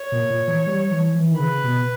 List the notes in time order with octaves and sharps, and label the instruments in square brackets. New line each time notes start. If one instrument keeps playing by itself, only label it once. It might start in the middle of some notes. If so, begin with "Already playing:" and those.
Already playing: [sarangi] C#5
[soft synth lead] A#2
A#2
E3
G3
E3
E3
D#3
[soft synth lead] C#3 [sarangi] B4
[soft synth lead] B2